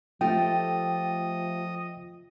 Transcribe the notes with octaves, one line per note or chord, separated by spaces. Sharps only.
F3 A3 F4 G4 D#5 G5 D#6